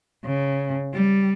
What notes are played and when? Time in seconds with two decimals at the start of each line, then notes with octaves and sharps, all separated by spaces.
0.25 C#3
0.94 G3